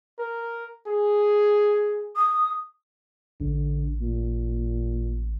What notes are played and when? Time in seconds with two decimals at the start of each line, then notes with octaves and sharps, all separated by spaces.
0.19 A#4
0.86 G#4
2.17 D#6
3.40 A1 D3
4.01 A#2